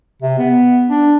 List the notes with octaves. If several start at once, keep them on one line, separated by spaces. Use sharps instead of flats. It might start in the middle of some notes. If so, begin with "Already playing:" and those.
C3
B3
D4